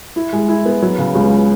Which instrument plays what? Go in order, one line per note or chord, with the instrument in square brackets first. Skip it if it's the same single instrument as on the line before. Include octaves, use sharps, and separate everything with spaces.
[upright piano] E4
G#3
E4
B3
F#3
C#3
C#2